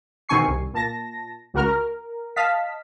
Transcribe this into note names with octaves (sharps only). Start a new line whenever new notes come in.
B2 D#3 C4 G#5 C#6 C7
C2
A#2 A5 A#6
C#2 F#4 A#4 F6
A#4
D#5 F5 A5 B6